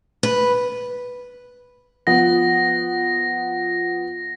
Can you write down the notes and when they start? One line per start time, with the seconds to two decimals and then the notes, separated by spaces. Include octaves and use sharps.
0.23 B4
2.07 F3 B3 A#6